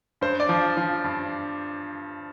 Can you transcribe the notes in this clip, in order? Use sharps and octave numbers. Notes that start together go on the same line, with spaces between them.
G2 C5
D5
F3
F3
G2